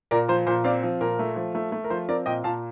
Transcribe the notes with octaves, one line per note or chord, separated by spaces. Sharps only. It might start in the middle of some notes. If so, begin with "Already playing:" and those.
A#2 A#4 D5
F3 C5
A#2 C5
C4 D5 F5
F3
A#2 A#4
A3
F3
A3
A3
A#4
F3 C5
C4 A#4 D5
A#2 D#5 G5
A#2 F5 A5